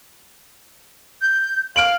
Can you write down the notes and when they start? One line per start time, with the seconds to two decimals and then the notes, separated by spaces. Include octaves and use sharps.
1.22 G6
1.76 F5 F6 D7 F#7